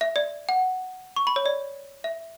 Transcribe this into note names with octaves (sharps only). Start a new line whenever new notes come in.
E5
D5
F#5
C#6
B5
C#5
D5
E5